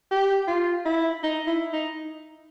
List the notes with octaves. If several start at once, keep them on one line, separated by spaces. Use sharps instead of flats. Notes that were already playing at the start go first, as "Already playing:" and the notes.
G4
F4
E4
D#4
E4
D#4